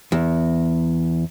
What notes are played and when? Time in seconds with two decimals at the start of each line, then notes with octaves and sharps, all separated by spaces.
0.12 E2